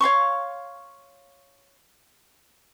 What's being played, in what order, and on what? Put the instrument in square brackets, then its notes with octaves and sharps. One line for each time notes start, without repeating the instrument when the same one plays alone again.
[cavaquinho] C#5 F5 C6 C#6